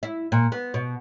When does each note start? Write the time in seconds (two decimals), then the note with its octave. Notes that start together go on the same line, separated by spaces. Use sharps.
0.03 E4
0.32 A#2
0.52 B3
0.74 B2